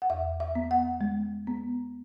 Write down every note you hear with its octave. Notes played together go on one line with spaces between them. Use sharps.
F#5
E2 E5
E5
B3
F#5
G#3
B3